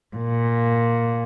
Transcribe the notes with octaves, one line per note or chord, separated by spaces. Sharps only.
A#2